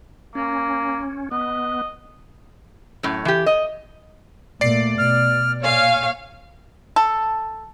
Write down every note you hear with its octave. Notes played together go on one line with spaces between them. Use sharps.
A#3 C#4
B3 D#5
F#2 A2
E3 G4
D#5
A#2 A3 D5 C7
B2 F6
A#2 C#5 F5 G#5
A4